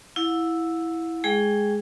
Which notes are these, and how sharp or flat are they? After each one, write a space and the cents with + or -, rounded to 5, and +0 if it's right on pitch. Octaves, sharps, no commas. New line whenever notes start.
E4 +0 F#5 -40
G#3 +0 G#4 +0 G5 +0